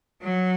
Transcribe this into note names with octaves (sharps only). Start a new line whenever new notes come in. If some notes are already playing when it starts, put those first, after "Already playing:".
F#3